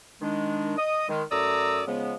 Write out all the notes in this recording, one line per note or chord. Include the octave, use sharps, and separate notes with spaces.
D#3 G#3 D4
D#5 D#6
D#3 G#3
F#2 A3 D5 A#5 D#6 E6
C#3 F3 G#3 B3